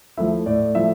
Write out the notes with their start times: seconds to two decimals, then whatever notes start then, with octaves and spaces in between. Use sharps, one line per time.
0.17 F3 A3 E4 E5
0.46 A2 D5
0.75 F3 A3 E4 E5